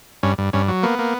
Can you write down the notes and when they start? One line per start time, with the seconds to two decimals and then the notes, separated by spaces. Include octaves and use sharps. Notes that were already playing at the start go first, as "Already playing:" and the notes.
0.23 G2 C#4
0.38 G2
0.53 G2 C#4
0.68 F#3
0.83 A#3 B3
0.99 A#3